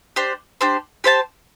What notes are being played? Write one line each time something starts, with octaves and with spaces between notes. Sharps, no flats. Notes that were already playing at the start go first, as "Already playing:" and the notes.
D4 G4 C5
D4 G4 C5
G4 C5 F#5 A5